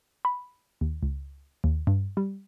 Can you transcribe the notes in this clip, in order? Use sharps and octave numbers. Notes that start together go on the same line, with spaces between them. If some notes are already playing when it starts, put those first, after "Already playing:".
B5
D#2
C#2
D#2
G2
G3